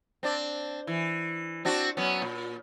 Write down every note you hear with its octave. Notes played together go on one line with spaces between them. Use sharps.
C4 D4 D5
E3
C4 D4 F#4
F#3 B3 C#4
A#2